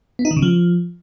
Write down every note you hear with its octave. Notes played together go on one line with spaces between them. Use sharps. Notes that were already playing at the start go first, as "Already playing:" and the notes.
B3
D#4
D#3
C#3
F3